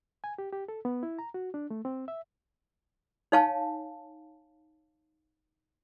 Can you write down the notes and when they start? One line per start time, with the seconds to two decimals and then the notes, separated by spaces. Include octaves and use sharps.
0.24 G#5
0.38 G4
0.52 G4
0.68 A4
0.85 B3
1.03 E4
1.19 A#5
1.34 F#4
1.54 D4
1.70 A3
1.85 C4
2.08 E5
3.32 D#4 C#5 F5 G#5 A5